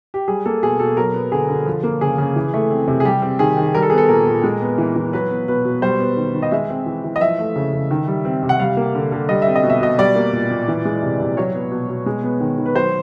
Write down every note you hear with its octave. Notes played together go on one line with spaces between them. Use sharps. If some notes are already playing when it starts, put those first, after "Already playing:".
G4
G3 G#4
A#3 A4
B2 G#4
B2 A4
F#3 A#4
B3
D3 G#4
D3
F3
A#3
C#3 G#4
C#3
E3
A3
C4
C3
G#4
G3 G4
C4
D#3 G#4
D#3
G3 A#4
A4
B3 G#4
A4
A#2 A#4
A#2
G#3
B3
E3
E3
F#3 B4
B3
B2 B4
B2
G3 C5
B3
D#3
D#3
D#5
G#3 E5
C4
E3
E3
D#5
F3 E5
A3
C#3
C#3
D#3
G3
C4
C3
F#5
G3 F5
A#3
D3
D3
G3 D#5
C4 E5
D#5
B2
E5
B2 D#5
G3 D5
A#3
A#2
A#2
E3
G#3
C3
C3
F#3 C#5
B3
B2
B2
G#3
B3
D#3
D#3
B4
F#3 C5